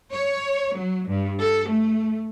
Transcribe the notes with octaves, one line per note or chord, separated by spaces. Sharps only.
C#5
F#3
G2
A4
A3